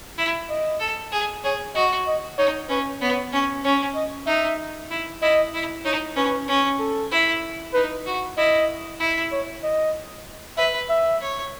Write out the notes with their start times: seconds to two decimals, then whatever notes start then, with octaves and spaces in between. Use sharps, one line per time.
0.18 E4
0.49 D#5
0.80 A4
1.12 G#4
1.44 G#4 C#5
1.75 F#4 D#5
2.07 D#5
2.38 D#4 C#5
2.69 C#4 B4
3.02 B3 C#5
3.33 C#4
3.64 C#4 C#5
3.95 D#5
4.27 D#4 E5
4.91 E4
5.22 E4 D#5
5.54 E4
5.85 D#4 C#5
6.16 C#4 B4
6.48 C#4
6.79 A4
7.11 E4
7.74 D#4 B4
8.06 F#4
8.37 E4 D#5
9.00 E4
9.32 C#5
9.64 D#5
10.57 B4 E5
10.90 E5
11.21 C#5